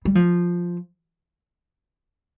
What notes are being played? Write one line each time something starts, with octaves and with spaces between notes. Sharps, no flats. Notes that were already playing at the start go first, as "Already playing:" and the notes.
G3
F3